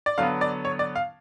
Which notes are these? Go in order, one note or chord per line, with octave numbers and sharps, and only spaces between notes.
D5
D3 F#3 B3 F5
D5
C#5
D5
F5